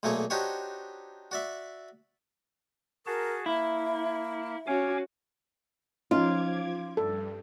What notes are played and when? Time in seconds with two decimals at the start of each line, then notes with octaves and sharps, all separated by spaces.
0.03 B1 A#2 A3 A#3 G#4 C#5
0.30 D4 D#4 F#4 G4 C5 C#5
1.31 F#4 D5 E5
3.06 F#4 G#4 A#4 A5
3.46 A#3 E4 E5
4.67 C#4 F#4 F5 G#5 D6
6.11 F3 C#4 D#4 F4 D6 G#6
6.97 G2 A4